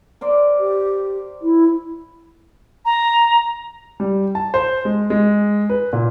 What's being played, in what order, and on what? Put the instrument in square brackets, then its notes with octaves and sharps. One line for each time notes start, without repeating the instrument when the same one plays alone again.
[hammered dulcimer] A#4 C5 D5
[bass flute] G4
E4
[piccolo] A#5
[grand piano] G3
A5
C5
G#3
G#3
B4
A#2